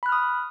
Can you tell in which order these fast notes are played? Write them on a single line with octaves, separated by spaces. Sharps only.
B5 F#6 F6 D#6